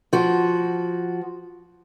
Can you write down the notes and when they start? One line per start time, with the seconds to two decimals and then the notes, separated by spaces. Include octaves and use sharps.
0.13 F3 F#4